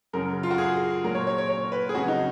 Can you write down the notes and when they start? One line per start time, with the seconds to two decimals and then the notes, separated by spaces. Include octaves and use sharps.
0.13 F#2 C#3 F#3 A#4
0.43 F4
0.51 F#4
0.58 G#4
1.04 A#2 F#3 A#4
1.15 C#5
1.27 C#5
1.38 C#5
1.49 C#5
1.72 B4
1.89 G#4
1.95 F2 C#3 F#3 F#4
2.08 D#4